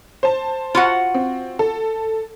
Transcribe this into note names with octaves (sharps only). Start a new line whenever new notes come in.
C5 A5
F4 F#4 F#5
C4
A4